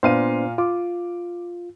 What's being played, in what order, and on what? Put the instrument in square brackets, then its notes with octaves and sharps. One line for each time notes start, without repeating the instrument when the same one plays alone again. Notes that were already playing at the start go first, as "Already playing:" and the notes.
[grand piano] A#2 F5 D#7 [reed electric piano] B3 D4 C5
[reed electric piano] F4 [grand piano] D6